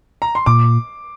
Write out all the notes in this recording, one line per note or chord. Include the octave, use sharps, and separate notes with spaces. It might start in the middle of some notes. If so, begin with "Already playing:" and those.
A#5
C6
A#2 D6